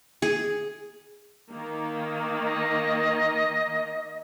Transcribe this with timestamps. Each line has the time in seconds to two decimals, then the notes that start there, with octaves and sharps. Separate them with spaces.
0.22 G#4
1.52 D#3 A#3
2.43 D#5